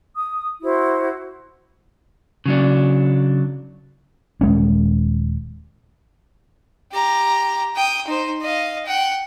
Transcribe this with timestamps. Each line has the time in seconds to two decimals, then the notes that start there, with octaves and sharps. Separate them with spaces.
0.15 D#6
0.62 E4 F#4 C5
2.46 C#3 F#3 D4
4.41 D#1 G#3 C#4
6.92 G4 A#5
7.76 G5 D#6
8.07 D#4 C5
8.42 D#5 F5
8.86 F#5 G5